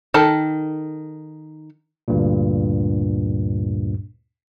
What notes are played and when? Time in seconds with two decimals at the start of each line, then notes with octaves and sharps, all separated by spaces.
0.14 D#3 A4 A5
2.08 D2 G2 A#2